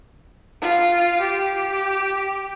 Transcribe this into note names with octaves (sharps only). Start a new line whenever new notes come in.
F4
G4